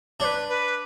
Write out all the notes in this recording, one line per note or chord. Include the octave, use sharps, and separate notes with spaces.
D4 B4 C#5
B4